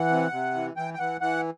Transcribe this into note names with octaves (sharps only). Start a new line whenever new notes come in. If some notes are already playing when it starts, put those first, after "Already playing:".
Already playing: E3 F#5
C3
C3
E3
E3 G5
G5
E3 F#5
E3 F#5